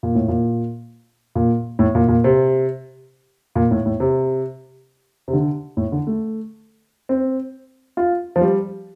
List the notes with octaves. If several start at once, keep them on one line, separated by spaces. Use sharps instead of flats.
A#2
A2
A#2
A#2
A2
A#2
A#2
C3
A#2
A2
A2
C3
C3
D3
A2
D3
A3
C4
F4
F3
G3